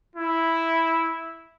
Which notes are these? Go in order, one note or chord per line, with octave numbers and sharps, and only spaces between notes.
E4